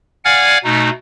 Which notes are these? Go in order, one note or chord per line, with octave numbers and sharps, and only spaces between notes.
D5 F5 F#5 G#5 F6 G#6
B2 A3 D#4